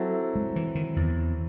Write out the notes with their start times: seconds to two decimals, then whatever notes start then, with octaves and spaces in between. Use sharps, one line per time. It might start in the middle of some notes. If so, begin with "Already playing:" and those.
Already playing: F#3 C4 E4 A4
0.35 G#3
0.56 E3
0.75 D#3
0.96 E2